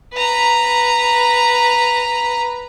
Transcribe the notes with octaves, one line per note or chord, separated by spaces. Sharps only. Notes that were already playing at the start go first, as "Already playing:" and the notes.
B4 A#5